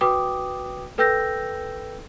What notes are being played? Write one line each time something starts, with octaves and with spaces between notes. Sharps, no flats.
F#4 B4 G5 D6 D#6
A4 B4 G5 E6 G6 A#6